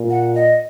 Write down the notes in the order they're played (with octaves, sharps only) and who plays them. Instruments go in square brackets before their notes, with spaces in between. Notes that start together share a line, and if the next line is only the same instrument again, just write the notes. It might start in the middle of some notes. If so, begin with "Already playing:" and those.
Already playing: [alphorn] A#2
[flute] F#5
D#5